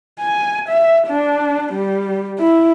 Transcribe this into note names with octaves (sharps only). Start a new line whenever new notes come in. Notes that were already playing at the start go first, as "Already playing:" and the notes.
G#5
E5
D4
G3
E4